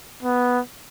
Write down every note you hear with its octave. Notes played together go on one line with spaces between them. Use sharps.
B3